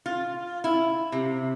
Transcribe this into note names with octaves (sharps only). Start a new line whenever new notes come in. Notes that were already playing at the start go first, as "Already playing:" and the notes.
F4
E4
C3